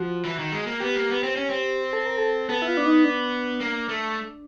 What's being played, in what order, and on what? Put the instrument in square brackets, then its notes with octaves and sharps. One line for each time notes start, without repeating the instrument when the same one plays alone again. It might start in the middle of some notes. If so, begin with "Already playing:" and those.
Already playing: [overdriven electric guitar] F3 [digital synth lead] F#4
[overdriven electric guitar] E3
D#3
G#3
A#3
[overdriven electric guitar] B3 [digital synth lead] G4
[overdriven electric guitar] A#3
B3
C4
C#4
C4
[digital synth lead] A4
A#4
A4
[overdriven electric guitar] B3 [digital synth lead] A4
[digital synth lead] E4
F4
D4
D#4
D4
[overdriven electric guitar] A#3
A3